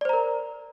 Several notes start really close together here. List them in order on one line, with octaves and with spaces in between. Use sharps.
D5 C5 A#5 A#4